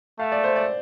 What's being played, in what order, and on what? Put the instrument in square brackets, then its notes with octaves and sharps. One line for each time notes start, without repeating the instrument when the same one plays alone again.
[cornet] A3 [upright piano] F5
[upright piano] D5
C5
D5